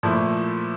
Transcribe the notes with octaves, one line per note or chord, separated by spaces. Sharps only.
A#2 F3 A3 E4